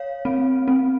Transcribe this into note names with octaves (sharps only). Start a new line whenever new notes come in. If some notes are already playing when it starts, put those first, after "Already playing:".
Already playing: C#5 F5
C4
C4